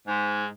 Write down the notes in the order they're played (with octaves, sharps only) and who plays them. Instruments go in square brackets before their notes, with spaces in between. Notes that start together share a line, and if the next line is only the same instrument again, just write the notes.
[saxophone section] G#2